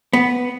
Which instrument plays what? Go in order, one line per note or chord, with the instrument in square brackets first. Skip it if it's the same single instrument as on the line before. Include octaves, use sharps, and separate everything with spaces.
[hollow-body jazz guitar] B3